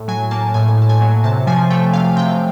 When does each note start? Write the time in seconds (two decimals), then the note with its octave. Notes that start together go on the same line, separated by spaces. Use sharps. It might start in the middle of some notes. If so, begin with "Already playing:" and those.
Already playing: A2
0.08 F#3 G#5
0.31 A#3 A5
0.54 A2 G#5
0.78 A2 A5
0.89 G#5
1.01 F#3
1.24 C3 A5
1.47 F3 G#5
1.70 A3 G5
1.93 C3 F5
2.16 C3 G5